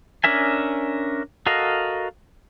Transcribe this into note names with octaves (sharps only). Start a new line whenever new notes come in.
C#4 D4 A#4 E5 G#5
F#4 A4 A#4 D#5 F5